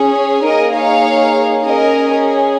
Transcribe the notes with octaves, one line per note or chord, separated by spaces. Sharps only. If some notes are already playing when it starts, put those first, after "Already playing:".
Already playing: C#4 G#4
C#5
A#3 D#4 G#4 A#4 D#5
C#5 F5
C#4 G#4 A#4 D#5